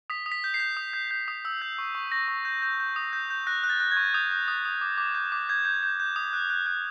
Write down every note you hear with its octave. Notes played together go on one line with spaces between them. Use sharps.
D#6 B6
D#6
B6
G6
C7
G6
D#6
G6
G6
D#6
E6
G6
C#6
C#6
C#6 A#6
C#6
G6
G6
G6
D#6
G6
G6
F#6 A#6
F#6
A6
F#6
G#6
C#6
D#6 G6
G6
D#6
D#6
D6
D6
G6
D6
G6 G#6
G6
G6
G6
D#6
F#6
F#6
F#6